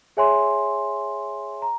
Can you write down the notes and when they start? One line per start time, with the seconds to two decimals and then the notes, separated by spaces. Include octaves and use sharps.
0.17 G#4 C#5 E5 G#5 C6
1.62 A#5